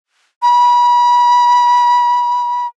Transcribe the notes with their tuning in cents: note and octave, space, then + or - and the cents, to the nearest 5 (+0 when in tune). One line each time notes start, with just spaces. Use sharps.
B5 -30